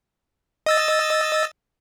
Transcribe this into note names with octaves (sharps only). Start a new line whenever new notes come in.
D#5 E6 A6